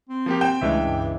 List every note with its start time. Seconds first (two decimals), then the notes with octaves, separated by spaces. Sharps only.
0.09 C4
0.26 F3 A#3 G4
0.41 G5 G6 E7
0.62 C#2 E3 G#3 A3 D4 E5
0.85 G2